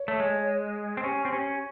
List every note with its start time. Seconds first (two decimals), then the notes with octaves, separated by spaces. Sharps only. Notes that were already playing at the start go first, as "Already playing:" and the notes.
Already playing: C#5
0.08 A3
0.20 G#3
0.97 C4
1.04 C#4 G4
1.25 C4
1.32 C#4 G4